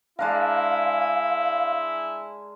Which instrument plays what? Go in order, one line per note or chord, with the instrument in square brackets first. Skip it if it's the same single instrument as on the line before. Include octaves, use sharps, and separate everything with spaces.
[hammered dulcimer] G#3 D4 A#4 [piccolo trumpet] E4 [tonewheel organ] F5